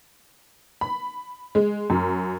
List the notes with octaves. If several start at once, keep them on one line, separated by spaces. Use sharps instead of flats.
B5
G#3
F#2